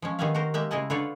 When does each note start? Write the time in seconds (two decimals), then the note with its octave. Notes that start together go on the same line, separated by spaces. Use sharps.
0.02 F3 G#3 C#4
0.19 D#3 B3 G4 G#4 E5 F5
0.34 F#4 G4 A#4 C5
0.54 G#3 A#3 G4 E5
0.71 C#3 G#3 E4 G#4 D#5 A5
0.90 D3 F4 A4 B4 C#5 D5